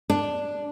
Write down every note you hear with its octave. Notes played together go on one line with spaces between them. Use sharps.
D4